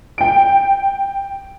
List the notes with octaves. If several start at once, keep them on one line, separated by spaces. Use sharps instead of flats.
G5 D7